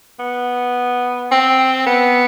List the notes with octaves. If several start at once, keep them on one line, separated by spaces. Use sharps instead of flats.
B3
C4
B3